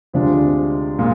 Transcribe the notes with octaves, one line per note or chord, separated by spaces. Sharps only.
D2 C3 F3 G#3 D4
A#2 G#3